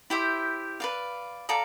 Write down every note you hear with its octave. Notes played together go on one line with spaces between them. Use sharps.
E4 G4 C5 E5
B4 D5 F5
A4 D5 F5 A#5